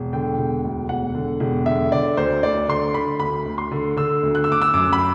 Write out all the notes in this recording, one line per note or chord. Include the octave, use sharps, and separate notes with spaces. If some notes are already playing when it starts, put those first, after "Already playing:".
Already playing: E1
D3 G5
E1
D2
E1 F#5
D3
E1
D3 E5
D3 D5
D2 C5
D2 D5
D3 C6
D3 B5
D2 B5
D2
C6
D3
D3 E6
D2
F#6
E6
D2 D6
E6
F#2 D6
B5